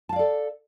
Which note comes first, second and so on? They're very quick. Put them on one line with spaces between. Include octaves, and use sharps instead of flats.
A5 F5 D5 A4